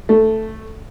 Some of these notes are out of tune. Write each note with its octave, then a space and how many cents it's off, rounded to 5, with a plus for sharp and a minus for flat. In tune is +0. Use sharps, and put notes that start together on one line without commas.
A3 +0